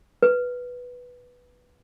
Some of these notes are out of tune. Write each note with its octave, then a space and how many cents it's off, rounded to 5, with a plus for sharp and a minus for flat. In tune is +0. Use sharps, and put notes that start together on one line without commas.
B4 -5